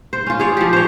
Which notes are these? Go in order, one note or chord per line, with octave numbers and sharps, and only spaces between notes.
C5
C#4 F4
G#4 C#5 D5
F3 G4
C5 C#5